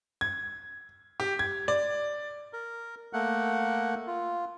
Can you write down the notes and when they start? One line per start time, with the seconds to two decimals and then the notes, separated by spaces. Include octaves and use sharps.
0.21 G#6
1.20 G4
1.39 G#6
1.68 D5
2.53 A#4
3.13 A3 A#3 F#5
4.07 F4